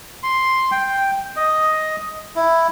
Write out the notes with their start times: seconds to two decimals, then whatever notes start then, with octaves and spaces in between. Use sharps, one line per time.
0.23 C6
0.71 G5
1.36 D#5
2.35 E4